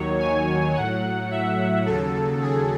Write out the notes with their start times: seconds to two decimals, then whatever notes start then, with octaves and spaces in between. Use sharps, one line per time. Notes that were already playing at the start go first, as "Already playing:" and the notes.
Already playing: D#2 D#3 F#3 C#5
0.19 G#5
0.74 A2 F#3 F#5
1.31 E5
1.86 D#2 C#3 F#3 A4
2.42 G#4